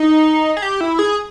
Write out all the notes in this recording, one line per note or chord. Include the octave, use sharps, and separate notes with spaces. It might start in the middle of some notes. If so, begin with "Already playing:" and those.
Already playing: D#4
G#4
G4
E4
G#4